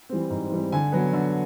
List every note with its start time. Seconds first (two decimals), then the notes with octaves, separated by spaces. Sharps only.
0.09 E3 G3 C4
0.30 G#2
0.51 E3 G3 C4
0.72 D3 G#5
0.92 F#3 B3
1.13 D3